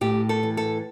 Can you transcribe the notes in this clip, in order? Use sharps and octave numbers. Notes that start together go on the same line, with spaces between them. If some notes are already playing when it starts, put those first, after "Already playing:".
A2 G4
A4
E3
A4